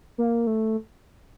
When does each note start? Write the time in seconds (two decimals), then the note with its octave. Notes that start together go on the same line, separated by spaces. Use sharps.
0.18 A#3
0.47 A3